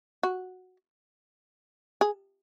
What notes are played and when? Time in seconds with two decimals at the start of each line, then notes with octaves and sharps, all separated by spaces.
0.23 F#4
2.01 G#4